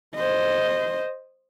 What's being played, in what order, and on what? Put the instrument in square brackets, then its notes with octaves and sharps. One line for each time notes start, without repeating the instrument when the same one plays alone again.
[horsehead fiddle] C5 D#5